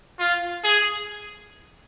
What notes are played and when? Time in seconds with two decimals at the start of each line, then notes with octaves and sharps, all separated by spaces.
0.19 F4
0.64 G#4